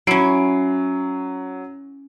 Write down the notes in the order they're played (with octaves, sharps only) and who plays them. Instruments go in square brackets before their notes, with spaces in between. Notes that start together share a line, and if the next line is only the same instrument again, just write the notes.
[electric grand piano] F#3 C7 D7 [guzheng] C#4 E4